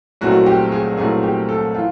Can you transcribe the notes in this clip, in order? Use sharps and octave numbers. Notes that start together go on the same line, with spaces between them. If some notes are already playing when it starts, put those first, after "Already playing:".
C2 A#2 F#3 A3 C4 F#4
G4
G#4
C2 A#2 F#3 A3 C4 G#4
G4
A4
E3 F4